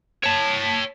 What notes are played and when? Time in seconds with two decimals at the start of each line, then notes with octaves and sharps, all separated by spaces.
0.24 C#5 A5